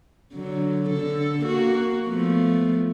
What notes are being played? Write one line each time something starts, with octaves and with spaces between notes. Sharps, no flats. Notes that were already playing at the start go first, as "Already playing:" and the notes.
D3 F#3
D3 A4
A#3 F#4
F3 A3 B3